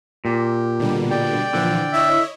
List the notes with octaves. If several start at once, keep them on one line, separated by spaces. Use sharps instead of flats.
A#2 G4
B2 D3 G3
D5 G5
A#2 D3 E3 F3
E4 C#5 D#5 E5